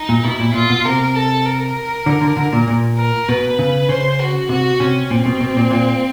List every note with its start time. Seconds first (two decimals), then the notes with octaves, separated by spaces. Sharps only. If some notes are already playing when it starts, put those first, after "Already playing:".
Already playing: D#4
0.09 A#2
0.24 B2 E4
0.40 A#2
0.54 A#2 F4
0.70 B2
0.85 C3 A#4
1.15 A4
1.46 A#4
2.06 D3
2.21 D3
2.37 D3
2.53 A#2
2.68 A#2
2.98 A#4
3.28 B2 B4
3.59 C#3
3.89 C#3 C5
4.20 F#4
4.49 C3 F#4
4.80 C3 C#4
5.10 A#2 C4
5.26 B2
5.41 B2
5.57 A#2
5.71 A#2